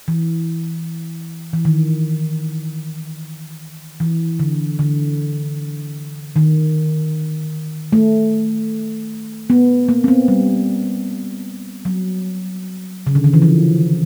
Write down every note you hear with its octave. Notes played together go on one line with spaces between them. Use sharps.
E3
E3
D#3
E3
D3
D3
D#3
A3
B3
A#3
C4
B3
G3
F#3
C#3
D3
D#3
E3
F3